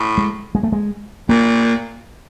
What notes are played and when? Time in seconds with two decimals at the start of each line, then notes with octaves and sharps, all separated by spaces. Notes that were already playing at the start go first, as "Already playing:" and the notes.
Already playing: A2
0.18 G#3
0.55 G#3
0.63 A3
0.72 G#3
1.29 A#2 A#3